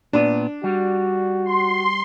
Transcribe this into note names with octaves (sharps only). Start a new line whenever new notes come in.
A#2 B3 D4
G3 F#4
C6